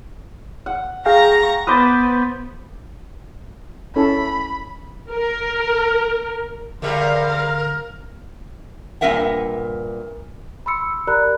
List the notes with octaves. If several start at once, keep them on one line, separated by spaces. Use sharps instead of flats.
F#5
G#4 F5 G5 A#5 C#6 A#6
B3 B4 C5 D6 D#6 G6 A6
C#4 E4 A4 B5
A#4
E2 D3 G3 A#4 C5 E5 F5
G2 A#2 C4 A#4 E5 F#5
B5 C6 E6 C#7
G4 A#4 D5 A#5 B5 F#6